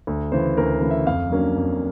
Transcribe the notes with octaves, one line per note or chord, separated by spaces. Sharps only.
D2
C#3 E3 C5
D2 A#4
B4
C#3 E3
E5
F2 F5
D3 F#3 A#3 C#4
F2